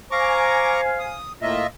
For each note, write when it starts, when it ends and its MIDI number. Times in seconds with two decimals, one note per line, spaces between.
0.11 1.18 72
0.11 1.18 77
0.11 1.18 80
0.11 0.81 82
0.11 0.81 85
0.11 0.81 86
0.99 1.32 87
1.42 1.63 45
1.42 1.63 58
1.42 1.67 65
1.42 1.67 75
1.42 1.67 76